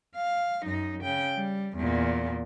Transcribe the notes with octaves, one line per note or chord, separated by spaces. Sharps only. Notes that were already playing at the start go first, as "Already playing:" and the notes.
F5
F#2 D#4
C#3 G5
G3
E2 A#2